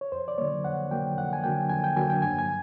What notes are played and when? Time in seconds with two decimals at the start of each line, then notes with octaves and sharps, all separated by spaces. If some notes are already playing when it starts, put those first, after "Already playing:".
0.01 C#5
0.12 F2 C5
0.28 D5
0.38 D3 F#3 A#3 C#5
0.64 F2 F#5
0.91 D3 F#3 A#3 G5
1.17 F2 F#5
1.33 G#5
1.44 D3 F#3 A#3 G5
1.70 F2 G#5
1.84 G5
1.96 D3 F#3 A#3 G#5
2.10 G5
2.22 G2 G#5
2.39 G#5